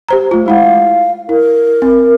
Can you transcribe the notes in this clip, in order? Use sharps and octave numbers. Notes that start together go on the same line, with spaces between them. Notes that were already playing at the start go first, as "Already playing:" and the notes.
G4 C5 A#5
A3 F4
G#3 E4 F5 F#5
E4 A#4
C4